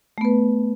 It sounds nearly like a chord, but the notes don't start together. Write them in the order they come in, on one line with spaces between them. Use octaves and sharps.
A3 B3 B4